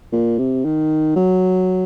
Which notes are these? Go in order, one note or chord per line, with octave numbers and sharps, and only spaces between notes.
A#2
C3
D#3
F#3